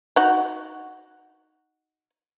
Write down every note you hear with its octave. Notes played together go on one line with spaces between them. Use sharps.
D#4 F#4